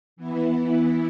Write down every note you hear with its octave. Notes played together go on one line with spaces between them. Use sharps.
E3 B3 E4